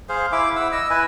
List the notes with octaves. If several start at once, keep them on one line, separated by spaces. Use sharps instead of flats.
G#4 C5 F5
E4 E5 D6
E4 F#5 E6
D#5 E6
E4 B4 G#5